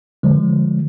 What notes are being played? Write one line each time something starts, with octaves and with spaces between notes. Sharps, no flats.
D3 F3 G#3